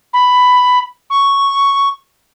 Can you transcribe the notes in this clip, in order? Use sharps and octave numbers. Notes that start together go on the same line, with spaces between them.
B5
C#6